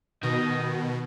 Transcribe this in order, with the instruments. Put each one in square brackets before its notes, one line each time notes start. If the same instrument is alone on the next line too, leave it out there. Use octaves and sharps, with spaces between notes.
[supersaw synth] B2 [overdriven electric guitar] D#3 [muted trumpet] D#5